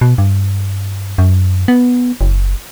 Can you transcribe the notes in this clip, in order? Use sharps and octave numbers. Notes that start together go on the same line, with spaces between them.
B2
G2
F#2
B3
F#1